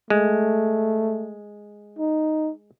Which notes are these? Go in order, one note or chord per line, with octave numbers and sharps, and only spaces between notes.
G#3 A3
D#4